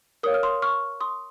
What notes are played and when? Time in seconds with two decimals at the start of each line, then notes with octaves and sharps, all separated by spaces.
0.23 A#4 C#5 F5 D#6
0.34 F6
0.43 C6 D#6
0.62 C#6 F6
1.00 C6 D#6